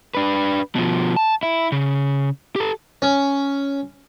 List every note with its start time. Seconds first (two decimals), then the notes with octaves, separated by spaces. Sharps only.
0.15 D4 B4
0.75 B2 F3
1.16 A5
1.43 E4
1.72 C#3
2.56 G4 A4
3.02 C#4